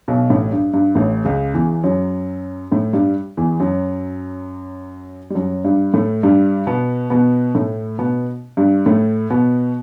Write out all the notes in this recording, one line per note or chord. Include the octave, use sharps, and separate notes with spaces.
B1 B2
A1 A2
G2
G2
A1 A2
C#2 C#3
E2 E3
F#2 F#3
A2 A3
G2 G3
E2 E3
F#2 F#3
G3
F#2 F#3
G2 G3
A2 A3
G2 G3
B2 B3
B2 B3
A2 A3
B2 B3
G2 G3
A2 A3
B2 B3